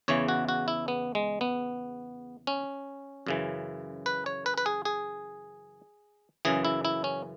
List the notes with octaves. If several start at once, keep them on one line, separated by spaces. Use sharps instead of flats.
E2 C#3 E3 C#5
F#4
F#4
E4
B3
G#3
B3
C#4
F#2 C#3 E3
B4
C#5
B4
B4
G#4
G#4
F#2 C#3 E3 G#4
E4
E4
C#4